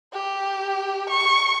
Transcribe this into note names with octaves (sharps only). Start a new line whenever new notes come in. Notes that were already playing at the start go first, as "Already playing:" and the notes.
G4
C#6